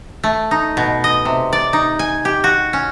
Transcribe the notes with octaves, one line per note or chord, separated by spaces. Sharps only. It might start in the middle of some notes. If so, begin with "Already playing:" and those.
A3
D#4
B2
D#5
C3
D5
D#4
G#5
G4
F#4
C#4